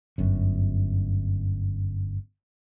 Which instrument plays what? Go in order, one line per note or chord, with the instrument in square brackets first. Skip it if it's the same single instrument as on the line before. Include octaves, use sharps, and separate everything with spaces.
[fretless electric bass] G1 F#2